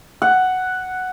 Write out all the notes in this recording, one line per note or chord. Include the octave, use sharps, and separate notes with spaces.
F#5